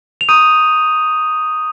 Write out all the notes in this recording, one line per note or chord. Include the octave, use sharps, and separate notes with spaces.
F7
A#5 C#6 D#6 G6 D#7